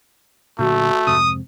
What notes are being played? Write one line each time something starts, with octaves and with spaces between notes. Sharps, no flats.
A#2 D3 F#3 A3 F#4
F2 G#2 C3 D#6